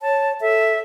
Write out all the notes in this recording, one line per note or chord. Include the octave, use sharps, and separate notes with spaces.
C#5 A5
A4 E5